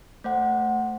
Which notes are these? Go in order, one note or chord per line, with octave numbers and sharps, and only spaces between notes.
A3 C5 F#5